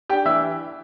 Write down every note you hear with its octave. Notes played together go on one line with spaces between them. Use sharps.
D4 G4 G5
E3 E5 E6